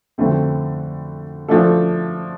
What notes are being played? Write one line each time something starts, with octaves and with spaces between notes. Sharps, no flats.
F2 D3 A3 C4
F3 A3 D4 A4